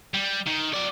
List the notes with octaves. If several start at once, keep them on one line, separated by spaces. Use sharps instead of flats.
G3
D#3
F#3 D5